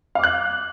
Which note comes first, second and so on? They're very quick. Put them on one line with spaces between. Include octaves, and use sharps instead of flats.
F5 D6 F#6